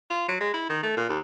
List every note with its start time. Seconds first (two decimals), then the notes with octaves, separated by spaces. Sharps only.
0.10 F4
0.28 F#3
0.40 G#3
0.54 E4
0.69 D#3
0.83 A3
0.97 A#2
1.09 D#2